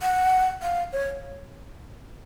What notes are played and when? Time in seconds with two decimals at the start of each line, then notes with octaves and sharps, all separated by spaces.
0.02 F#5
0.63 F5
0.93 C#5